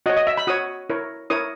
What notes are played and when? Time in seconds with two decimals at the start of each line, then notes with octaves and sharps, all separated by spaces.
0.06 F#4 D#5
0.09 C#5
0.17 D#5
0.27 E5
0.37 B5
0.47 F#4 C#5 D#6
0.90 E4 A#4 C#5
1.30 E4 A#4 C#5 D#6